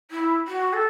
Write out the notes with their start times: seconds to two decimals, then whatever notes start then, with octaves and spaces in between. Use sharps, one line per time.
0.11 E4
0.48 F#4
0.73 A4